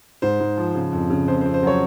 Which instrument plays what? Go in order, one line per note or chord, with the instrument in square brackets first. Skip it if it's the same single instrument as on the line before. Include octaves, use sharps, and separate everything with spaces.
[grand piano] G#2 C5
G#2
F3
C#3
F2
C#3
F2 C5
C5
F2
C5
F#3 C#5